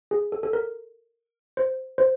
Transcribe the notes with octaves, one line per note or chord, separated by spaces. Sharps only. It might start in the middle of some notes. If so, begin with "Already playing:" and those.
G#4
A4
A4
A#4
C5
C5